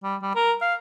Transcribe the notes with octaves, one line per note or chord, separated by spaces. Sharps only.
G3
G3
A#4
F5